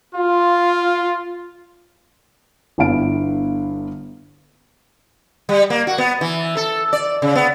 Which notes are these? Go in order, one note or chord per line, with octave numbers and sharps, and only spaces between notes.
F4
G1 D3 B3 E4 F5 D7
G3
A#3
F#4
B3
E3
A4
D5
C#3
B3